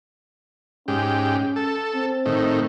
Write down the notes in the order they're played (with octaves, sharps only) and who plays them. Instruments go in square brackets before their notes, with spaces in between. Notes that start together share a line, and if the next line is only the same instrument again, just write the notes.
[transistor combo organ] G#2 G4 [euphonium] C#4
[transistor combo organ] A4
[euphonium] C4
[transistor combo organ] A2 D#3